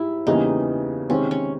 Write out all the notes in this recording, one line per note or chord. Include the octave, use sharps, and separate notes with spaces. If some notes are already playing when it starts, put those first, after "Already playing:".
Already playing: G#2 G3 E4
E2 C#3 E3 G3 A#3 D#4
C3 D#3 G#3 C4 C#4
C#4